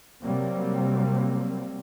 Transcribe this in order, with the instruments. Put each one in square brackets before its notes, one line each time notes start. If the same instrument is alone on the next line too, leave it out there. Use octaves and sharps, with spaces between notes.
[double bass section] C3 F#3 G3 A#3 C4